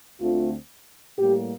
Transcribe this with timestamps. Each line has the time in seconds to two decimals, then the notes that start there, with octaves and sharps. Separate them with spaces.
0.20 D2 D3 A3 C4 F4
1.18 A2 G3 A#3 G4